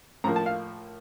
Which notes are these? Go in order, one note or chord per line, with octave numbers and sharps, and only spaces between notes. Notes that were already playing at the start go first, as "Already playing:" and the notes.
A2 F3 A#3 A#5
A5
F5